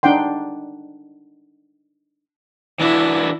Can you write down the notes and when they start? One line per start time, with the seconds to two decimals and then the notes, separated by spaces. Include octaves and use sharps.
0.03 D4 D#4 F#5 G5 C6
2.80 E3 D4 E4 F#4